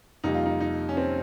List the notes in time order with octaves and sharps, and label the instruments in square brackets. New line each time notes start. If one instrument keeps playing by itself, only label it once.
[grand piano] F2 C3 G3 A#3 D#4
F4
D#4
D#4
C#4
C4